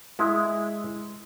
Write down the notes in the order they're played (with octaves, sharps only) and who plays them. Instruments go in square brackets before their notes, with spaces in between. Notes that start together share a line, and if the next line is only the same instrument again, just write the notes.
[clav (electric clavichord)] G#3 E4